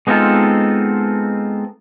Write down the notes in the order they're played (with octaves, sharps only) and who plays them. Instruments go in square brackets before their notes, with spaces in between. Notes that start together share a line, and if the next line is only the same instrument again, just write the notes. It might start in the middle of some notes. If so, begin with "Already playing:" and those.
[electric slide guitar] G#3 B3 C4 D#4 F4 A4